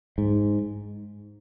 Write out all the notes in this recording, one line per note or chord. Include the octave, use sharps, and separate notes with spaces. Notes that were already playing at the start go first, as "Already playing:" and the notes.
G#2